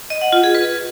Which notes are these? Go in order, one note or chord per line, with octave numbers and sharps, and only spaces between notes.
D#5
F#5
F4
G#4
B4